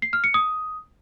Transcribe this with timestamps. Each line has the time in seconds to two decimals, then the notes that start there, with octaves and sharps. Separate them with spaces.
0.02 C7
0.13 F6
0.24 C#7
0.34 D#6